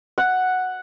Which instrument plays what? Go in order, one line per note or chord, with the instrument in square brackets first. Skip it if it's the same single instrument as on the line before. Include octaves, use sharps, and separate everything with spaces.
[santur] F#5